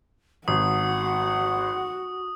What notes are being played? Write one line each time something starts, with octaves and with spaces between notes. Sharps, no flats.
G#1 F#4 F#5 D#6